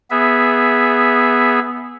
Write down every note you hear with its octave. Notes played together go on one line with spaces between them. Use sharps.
B3 G#4 E5